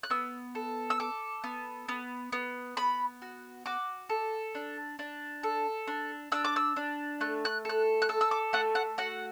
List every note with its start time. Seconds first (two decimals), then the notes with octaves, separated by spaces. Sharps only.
0.03 F#6
0.10 B3 E6
0.55 A4
0.90 E6
1.00 A4 D6
1.44 B3
1.89 B3
2.32 B3
2.77 B3 B5
3.22 F#4
3.66 F#4 D6
4.10 A4
4.55 D4
4.99 D4
5.43 A4
5.87 D4
6.32 D4 E6
6.45 D6
6.56 E6
6.76 D4
7.21 A3 F#6
7.45 F#6
7.65 A4 F#6
8.02 F#6
8.09 A4 E6
8.21 E6
8.31 D6
8.53 A3 F#5
8.75 F#5
8.98 F#4 F#5